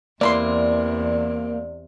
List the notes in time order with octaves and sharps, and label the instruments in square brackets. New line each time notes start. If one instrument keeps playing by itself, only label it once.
[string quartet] E2 C3 [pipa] E3 B5 C6 [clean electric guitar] A#3 [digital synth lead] D5